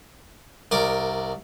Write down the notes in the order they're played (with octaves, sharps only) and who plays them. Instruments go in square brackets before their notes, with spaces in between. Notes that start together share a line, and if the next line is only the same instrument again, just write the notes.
[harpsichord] C2 A#4 D5 D6